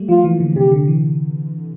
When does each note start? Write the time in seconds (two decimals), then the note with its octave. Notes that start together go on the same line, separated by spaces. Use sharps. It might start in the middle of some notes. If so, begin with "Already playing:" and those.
Already playing: G3 A3 A#3
0.09 F3 F4
0.24 E3
0.40 D3
0.56 C3 G4
0.72 D3
0.88 E3